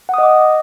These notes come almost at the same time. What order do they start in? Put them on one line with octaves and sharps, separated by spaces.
F#5 D#6 D#5 D6